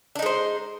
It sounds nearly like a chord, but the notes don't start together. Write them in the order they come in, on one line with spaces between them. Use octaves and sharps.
D4 D#4 G#3 C5